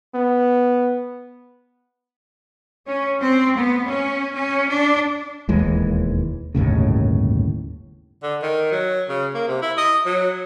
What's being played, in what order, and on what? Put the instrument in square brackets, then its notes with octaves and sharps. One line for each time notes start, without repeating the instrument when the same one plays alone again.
[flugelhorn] B3
[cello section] C#4
C4
B3
C#4
C#4
D4
[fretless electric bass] E1 D#2 E3 G#3
G1 D#2 A2 C#3
[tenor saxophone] D3
D#3
F#3
C#3
A#3
C3
E4
D#5
F#3